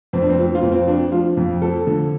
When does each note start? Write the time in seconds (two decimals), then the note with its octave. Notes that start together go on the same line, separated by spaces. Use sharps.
0.13 F2 C4
0.22 D4
0.30 C4
0.38 F3
0.55 F4
0.62 F2
0.72 C4
0.87 F3 D4
1.12 F3 F4
1.37 F2
1.62 F3 A4
1.87 D3